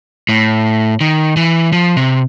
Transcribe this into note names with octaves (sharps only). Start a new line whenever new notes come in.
A2
D#3
E3
F3
C3